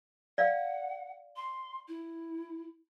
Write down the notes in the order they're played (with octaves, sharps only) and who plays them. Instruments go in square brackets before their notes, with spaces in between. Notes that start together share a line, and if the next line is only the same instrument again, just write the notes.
[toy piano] D5 F5 [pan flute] F#5
[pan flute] C6
E4